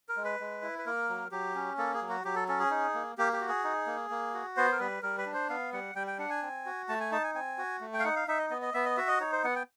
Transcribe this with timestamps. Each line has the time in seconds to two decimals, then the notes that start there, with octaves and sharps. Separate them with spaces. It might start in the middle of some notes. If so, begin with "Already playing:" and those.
0.09 A#4
0.17 G#3
0.24 B4
0.40 G#3
0.62 E4
0.79 B4
0.86 A#3 A#4
1.09 F#3
1.31 F#3 G4
1.55 C#4
1.78 A#3 A4
1.94 G#4
2.02 F#3
2.09 F#4
2.25 F#3 G4
2.36 A4
2.48 C#4 A4
2.60 G#4
2.70 D#4
2.94 A#3
3.18 A#3 G4
3.33 G4
3.41 F#4
3.49 G#4
3.64 D#4
3.86 A#3
4.10 A#3
4.34 F#4
4.57 B3 C5
4.72 A#4
4.80 G3 B4
5.02 G3 A#4
5.18 B4
5.26 D4
5.34 C5
5.49 B3 F5
5.73 G3 F#5
5.95 G3 G5
6.07 G5
6.18 D4 F#5
6.30 G#5
6.42 C4
6.66 F#4
6.89 A3 A5
7.00 G#5
7.12 D#4 A5
7.24 G#5
7.34 C4 G#5
7.58 F#4
7.81 A3
7.93 G5
7.99 F5
8.04 D#4 F#5
8.16 F5
8.28 D#4 E5
8.39 D#5
8.50 B3 D#5
8.62 D#5
8.74 B3 E5
8.85 D#5
8.97 F#4 E5
9.08 D#5
9.20 D#4 C#5
9.32 C5
9.44 B3 F#5
9.55 G5